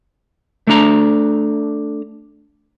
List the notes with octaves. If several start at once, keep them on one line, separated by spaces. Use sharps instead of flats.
A3 D4 A#5